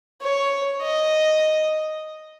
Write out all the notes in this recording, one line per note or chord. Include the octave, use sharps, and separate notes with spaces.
C#5
D#5